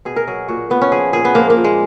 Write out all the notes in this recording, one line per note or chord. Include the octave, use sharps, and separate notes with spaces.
B2 G#4
A#4
F#3 G#4
A#2 F#4
A#2 B3
C#4
F3 G#4
A#2 G#4
B3
F3 A#3
A#3
A#2
G#3